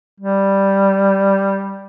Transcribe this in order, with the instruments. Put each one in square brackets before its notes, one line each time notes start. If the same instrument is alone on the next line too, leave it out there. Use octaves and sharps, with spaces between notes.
[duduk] G3